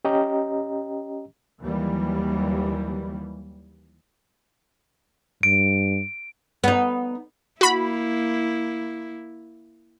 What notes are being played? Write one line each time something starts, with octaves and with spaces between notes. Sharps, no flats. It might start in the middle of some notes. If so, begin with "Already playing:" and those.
C#4 G4 D#5 G5 A#5
D#2 E3 F#3 G3
G2 D7
B3 D#4
A#3 E4 F#4 B5